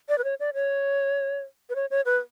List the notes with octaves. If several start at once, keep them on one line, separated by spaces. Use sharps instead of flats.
D5
B4
C#5
D5
C#5
B4
C#5
C#5
B4